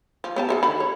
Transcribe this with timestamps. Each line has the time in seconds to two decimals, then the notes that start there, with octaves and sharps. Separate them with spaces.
0.24 F3
0.36 B3 G4 A5
0.49 G#4 A4 E5
0.63 D3 D#3 B5
0.80 C#5